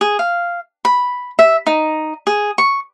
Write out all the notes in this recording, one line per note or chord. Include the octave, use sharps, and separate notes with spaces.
G#4
F5
B5
E5
D#4
G#4
C#6